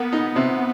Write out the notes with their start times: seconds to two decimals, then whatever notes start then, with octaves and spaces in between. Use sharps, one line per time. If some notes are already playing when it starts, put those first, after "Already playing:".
Already playing: A#3 B3
0.13 D#4
0.36 C3